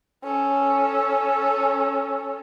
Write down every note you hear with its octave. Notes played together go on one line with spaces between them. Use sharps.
C#4 A4